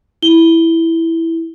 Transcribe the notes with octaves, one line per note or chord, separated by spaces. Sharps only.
E4 G7